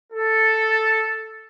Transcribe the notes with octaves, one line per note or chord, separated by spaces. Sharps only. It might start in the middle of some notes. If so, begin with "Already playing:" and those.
A4